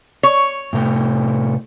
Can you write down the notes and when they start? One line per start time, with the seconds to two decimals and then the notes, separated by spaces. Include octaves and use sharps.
0.23 C#5
0.73 A2 C3 A3